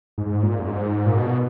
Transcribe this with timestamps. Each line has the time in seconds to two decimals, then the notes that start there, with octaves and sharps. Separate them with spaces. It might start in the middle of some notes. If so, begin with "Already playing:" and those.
0.18 G#2
0.43 A#2
0.59 F#2
0.67 G#2
1.06 A#2
1.17 B2